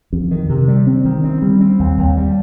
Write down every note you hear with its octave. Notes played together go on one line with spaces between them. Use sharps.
F2
D#3
C3
G3
C4
D#3
C4
G3
C4
D#2
D#2
G3